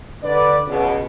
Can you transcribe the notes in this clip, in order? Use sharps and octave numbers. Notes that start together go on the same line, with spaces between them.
D3 B4 D5
C#2 B2